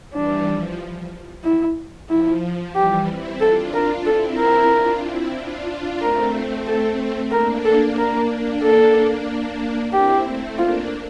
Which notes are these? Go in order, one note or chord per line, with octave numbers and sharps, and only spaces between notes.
E3 G3 D4
F3
E4
F3 E4
E3 G3 G4
C4 E4
D4 F4 A4
D4 F4 A#4
C4 E4 A4
A#4
D4 F4
C4 E4
D4 F4
D4 F4
A3 C4 A#4
A4
A#3 D4 A#4
A4
A#3 D4 A#4
A#3 D4
A4
C4 E4 G4
A3 C4
A#3 D4 F4